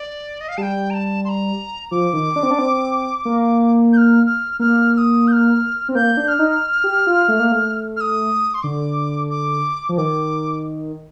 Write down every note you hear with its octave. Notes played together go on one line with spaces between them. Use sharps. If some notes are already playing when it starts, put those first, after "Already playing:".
Already playing: D5
D#5
F5
G3 G5 A5
A#5
A5
C6
A#5
F3 D6
D#3
D4
C4
D4
C4
A#3
G6
F6
F6
A#3 F6
F6
D#6
G6
F6
C4
A#3 G6
D4
F6
D#4
G4
F4
A3
A#3
A3
F6
D#6
C6
D3 D6
D6
F3
D#3 D6